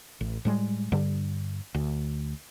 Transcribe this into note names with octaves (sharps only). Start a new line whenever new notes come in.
A1
A2 G3 G#3
G2 D3 G3
D2